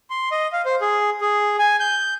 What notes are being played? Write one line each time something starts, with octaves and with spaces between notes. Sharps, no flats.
C6
D#5
F5
C5
G#4
G#4
G#5
G6